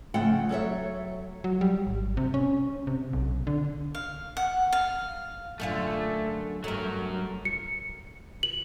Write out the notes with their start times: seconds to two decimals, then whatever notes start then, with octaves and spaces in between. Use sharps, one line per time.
0.14 C#3 F3 A3 F#5 G5
0.49 F#3 A4 C#5 E5
1.44 F#3
1.61 G3
1.87 G#1
2.17 C3
2.34 C#4
2.87 C3
3.13 B1
3.47 D3
3.95 F5
4.37 F#5
4.73 F5
5.60 F#2 D3 A3 F4
6.64 G2 F#3 A3 A#4
7.45 C#7
8.43 F#7